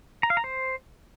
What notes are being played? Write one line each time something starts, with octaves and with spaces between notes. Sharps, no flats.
A#5
F5
A#5
C5